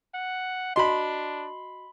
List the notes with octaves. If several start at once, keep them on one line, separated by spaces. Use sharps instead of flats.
F#5
D4 F#4 D#5 B5 C6